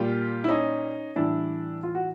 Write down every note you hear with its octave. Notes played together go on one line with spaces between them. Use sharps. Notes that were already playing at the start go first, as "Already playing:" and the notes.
Already playing: A#2 G3 F4 G4
E4
C#4 D#4
A2 E3 G3 D4 E4
F4
F#4